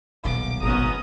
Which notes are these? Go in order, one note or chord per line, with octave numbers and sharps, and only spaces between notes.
D#1 B1 B2 D6
G#1 B3 C#4 A#5 D#6